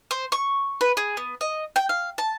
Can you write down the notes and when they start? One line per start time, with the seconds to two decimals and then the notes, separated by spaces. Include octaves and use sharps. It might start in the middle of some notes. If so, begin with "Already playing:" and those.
0.11 C5
0.32 C#6
0.81 B4
0.97 G#4
1.17 B3
1.41 D#5
1.76 G5
1.89 F5
2.18 A5